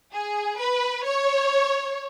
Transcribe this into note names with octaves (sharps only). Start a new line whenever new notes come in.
G#4
B4
C#5